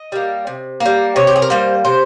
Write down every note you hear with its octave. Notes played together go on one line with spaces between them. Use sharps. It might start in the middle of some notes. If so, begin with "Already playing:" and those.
Already playing: D#5
G3 A#3
C3
A#3
G3
C3 C#5
G4
G#4
A#4
G3 A#3 C5
C3 C5